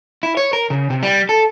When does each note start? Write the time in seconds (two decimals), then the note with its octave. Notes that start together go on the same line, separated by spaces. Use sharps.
0.23 E4
0.37 C#5
0.53 A#4
0.70 C#3
0.90 C3
1.03 G3
1.29 A4